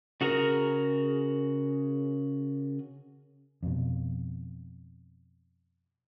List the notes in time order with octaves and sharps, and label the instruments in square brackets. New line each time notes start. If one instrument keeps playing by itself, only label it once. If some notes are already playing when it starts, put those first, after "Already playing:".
[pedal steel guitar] C#3 F#4 G#4 A#4 A#5
[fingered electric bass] F2 B2